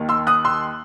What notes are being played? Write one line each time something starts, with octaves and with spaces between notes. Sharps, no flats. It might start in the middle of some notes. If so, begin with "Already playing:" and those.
Already playing: D#2 D#3
C6 E6
D#6 F#6
C6 E6